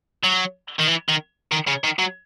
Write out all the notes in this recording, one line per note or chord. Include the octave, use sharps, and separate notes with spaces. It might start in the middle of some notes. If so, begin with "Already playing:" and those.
F#3
D#3
E3
D#3
D#3
C#3
D#3
F#3